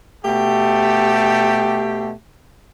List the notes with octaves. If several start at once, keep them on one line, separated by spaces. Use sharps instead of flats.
B2 A3 G4